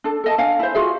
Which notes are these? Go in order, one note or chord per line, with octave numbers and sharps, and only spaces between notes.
D4 A4
A4 D#5 A5
D4 F5 G#5
E4 C5
F4 F#4 G#4 E5